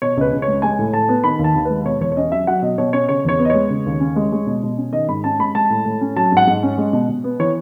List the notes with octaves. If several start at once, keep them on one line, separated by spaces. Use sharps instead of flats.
B2 C#5
C#2 B4
C#2
C#5
G#3
G#3 G#5
A2
A2 A5
B3
D#3 B5
D#2
A5
D#2
G#3 B4
B2 C#5
E2 C#5
C#5
C#4 D#5
F#3 E5
F#3 F#5
B2 D#5
B2 C#5
C#4 C#5
C#3 C#5
E2 C#5
B3
D#5
G#3 C#5
C#3
D#2
C#4
G#3
G#3
B2
B2
C#4
D#3 D#5
G#2 B5
C#4 A5
G#3 B5
G#3 A5
A2
A2
C#4
F#3 A5
G#2 F#5
G#2
C#4
G#3
B2
B2
B3
E3 C#5